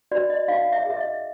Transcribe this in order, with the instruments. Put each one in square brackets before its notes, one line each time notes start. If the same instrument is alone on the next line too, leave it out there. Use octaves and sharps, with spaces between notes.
[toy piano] F#4 D5
D#5
D#4 F5
E5
G#4
E5
D#5